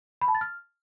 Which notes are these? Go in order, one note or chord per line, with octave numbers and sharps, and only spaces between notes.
B5
A5
A6
F6